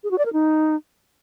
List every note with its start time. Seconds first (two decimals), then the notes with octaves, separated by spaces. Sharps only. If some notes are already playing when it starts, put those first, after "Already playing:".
0.04 G#4
0.11 F#4
0.18 D5
0.26 A#4
0.33 D#4